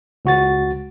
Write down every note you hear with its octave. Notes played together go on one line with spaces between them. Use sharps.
C#2 F#4 A6